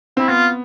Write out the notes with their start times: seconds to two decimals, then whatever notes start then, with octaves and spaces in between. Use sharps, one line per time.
0.17 C4 E4
0.28 B3 F4